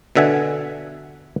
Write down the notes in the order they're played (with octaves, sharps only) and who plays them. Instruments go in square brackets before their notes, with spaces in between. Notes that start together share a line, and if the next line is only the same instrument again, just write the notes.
[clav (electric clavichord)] B2 D3 E5 F#5 G#5